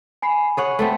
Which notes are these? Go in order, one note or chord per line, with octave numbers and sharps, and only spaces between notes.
G#5 B5 C7
G#4 C#5 F#5
A3 B3 C4